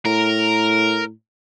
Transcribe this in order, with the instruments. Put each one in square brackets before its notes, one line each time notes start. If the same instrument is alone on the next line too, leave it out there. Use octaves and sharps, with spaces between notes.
[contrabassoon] A2 [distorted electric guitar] A#4